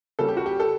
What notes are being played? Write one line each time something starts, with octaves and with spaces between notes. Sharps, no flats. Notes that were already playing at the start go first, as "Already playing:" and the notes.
C#3 G3 A4
G4
F#4
G4
A4